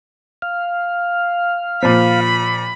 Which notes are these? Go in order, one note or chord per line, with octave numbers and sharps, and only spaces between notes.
F5
A#2 F3 B5